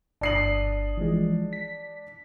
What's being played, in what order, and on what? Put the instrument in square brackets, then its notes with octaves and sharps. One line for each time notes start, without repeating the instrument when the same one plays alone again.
[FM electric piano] G1 D#6 [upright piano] D4 C7 F#7
[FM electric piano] E3 F3 G#3
B6